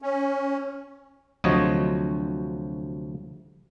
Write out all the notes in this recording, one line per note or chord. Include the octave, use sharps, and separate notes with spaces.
C#4
D2 C3 F3 F#3 C#5 D#5